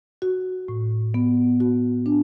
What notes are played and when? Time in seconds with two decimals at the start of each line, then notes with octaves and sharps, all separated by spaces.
0.22 F#4
0.68 A2
1.14 B3
1.60 F#4
2.06 D4